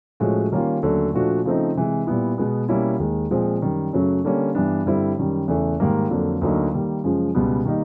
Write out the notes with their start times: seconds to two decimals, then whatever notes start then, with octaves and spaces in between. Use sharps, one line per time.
0.20 A2 F3 G#3 C#4 F#4
0.52 D#3 G3 A#3 C#4 F4
0.83 D#2 D3 F#3 A3 C#4
1.14 A#2 F3 A3 D4 F#4
1.45 C#3 F3 A3 C4 D#4
1.75 C3 E3 G#3
2.06 A#2 G3 B3 E4
2.38 B2 G#3 B3
2.69 B2 G3 A#3 C#4 E4
3.00 D#2 D#3 G#3
3.31 A#2 F3 G#3 C4
3.62 F#2 D#3 G3
3.93 F#2 C#3 F#3 A3
4.24 D3 G3 A#3 C#4
4.55 G2 E3 G3 B3 D4
4.86 G2 D3 G3 C4 E4
5.17 F#2 D#3 G3
5.48 E2 C#3 E3 A3
5.80 G#2 D#3 G3 A#3
6.10 F2 D3 F#3 A#3
6.41 D2 D3 F#3 A#3 D#4
6.73 D#3 G3 A#3
7.04 F#2 C#3 F3 G#3
7.35 C#2 B2 G3 B3
7.65 D#3 G3 A#3 D#4